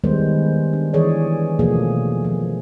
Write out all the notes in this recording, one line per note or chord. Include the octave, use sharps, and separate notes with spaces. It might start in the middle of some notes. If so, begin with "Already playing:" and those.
D#3 G3 G#3 B3 C5
D4
E3 G#4 C#5 D5
B2 F3 A3 A#3 G#4
F3